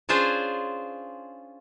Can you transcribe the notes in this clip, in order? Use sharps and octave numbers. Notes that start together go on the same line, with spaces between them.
C#4 D4 F4 G#4 C5